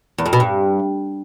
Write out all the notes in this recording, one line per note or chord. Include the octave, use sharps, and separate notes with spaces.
E2
F2
B2
G2